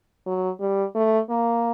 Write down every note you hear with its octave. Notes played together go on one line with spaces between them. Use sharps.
F#3
G3
A3
A#3